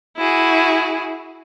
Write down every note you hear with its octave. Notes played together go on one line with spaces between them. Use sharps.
E4 F#4 G#4